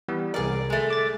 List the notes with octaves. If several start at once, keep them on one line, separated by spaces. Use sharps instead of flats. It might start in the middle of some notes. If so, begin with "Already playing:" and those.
E3 G3 B3
C2 G#4 A#4 D5
G#3 A3
D6 A6